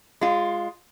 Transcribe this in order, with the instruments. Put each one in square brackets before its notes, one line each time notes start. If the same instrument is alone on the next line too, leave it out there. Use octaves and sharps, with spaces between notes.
[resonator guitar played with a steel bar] G#3 F4